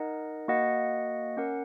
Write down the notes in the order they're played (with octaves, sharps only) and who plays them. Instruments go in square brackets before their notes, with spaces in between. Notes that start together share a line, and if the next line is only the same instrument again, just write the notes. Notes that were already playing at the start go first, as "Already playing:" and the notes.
Already playing: [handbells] D#4 A#4 D#5 F#5
A#3 F#4 D#5 F#5
C#4 A#4 F#5